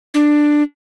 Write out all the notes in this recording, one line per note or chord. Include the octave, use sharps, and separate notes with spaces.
D4